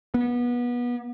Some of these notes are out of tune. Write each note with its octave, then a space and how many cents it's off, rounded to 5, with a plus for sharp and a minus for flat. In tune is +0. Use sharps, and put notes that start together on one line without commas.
B3 -25